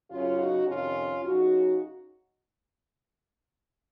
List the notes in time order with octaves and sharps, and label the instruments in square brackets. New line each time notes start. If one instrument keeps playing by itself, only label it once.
[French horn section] F#2 C#3 C#4 F4
D#4 F#4
F2 C3 D#3 C#4 F4
F#2 C#3 D#4 F#4